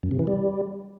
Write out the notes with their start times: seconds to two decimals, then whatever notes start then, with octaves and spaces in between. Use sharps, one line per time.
0.03 F#2
0.11 C3
0.19 E3
0.27 G3